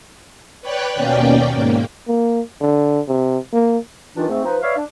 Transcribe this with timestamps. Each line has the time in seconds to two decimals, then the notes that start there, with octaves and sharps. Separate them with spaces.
0.62 B4 C#5 D5 G5 F#6
0.94 D#2 B2 A#3 C#4 D5 G5
1.52 G#2 A#3
2.07 A#3
2.61 D3
3.08 C3
3.53 A#3
4.16 G2 D#3 E3 D4 D#4 F4
4.29 G#2 A3 C4
4.45 F3 D#4 B4
4.62 B4 C#5 D5 E5 F5
4.77 D4